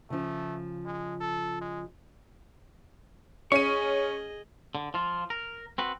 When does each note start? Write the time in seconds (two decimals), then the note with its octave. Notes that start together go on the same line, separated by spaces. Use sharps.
0.10 C#3 F3 A3
0.86 G#3
1.21 A4
1.61 G#3
3.52 C#4 G#4 D#5 C#6 D#7
4.75 D3
4.94 F3 F4
5.30 A#4
5.78 C4 F#4 B4